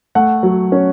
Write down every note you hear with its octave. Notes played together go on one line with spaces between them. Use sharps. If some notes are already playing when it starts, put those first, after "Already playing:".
A3 F#5
F#3
C#4